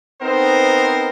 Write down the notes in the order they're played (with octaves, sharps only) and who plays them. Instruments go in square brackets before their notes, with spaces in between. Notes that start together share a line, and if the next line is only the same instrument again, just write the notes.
[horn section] B3 C4 D#4 A#4 C5